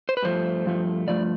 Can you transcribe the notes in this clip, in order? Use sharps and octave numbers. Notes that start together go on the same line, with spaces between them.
C5
B4
G2 F3 A3 C5
G2 F3 A3
G2 F3 A3 D5